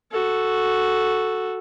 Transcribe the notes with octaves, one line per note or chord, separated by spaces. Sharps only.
F#4 A4